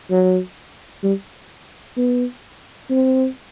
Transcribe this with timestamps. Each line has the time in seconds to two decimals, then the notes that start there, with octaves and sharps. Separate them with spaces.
0.10 F#3
1.03 G3
1.97 B3
2.90 C4